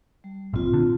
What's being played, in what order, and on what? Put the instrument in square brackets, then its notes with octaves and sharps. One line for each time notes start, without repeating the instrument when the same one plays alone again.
[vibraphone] G3
[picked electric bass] A#1 A#2 [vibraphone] C4 F4
[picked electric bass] D3